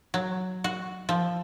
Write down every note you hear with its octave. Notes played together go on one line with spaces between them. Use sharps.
F#3
F#4
F3